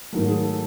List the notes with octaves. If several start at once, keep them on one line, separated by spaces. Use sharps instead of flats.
G#2 D#3 F#3 A3 A#4
G#4
A4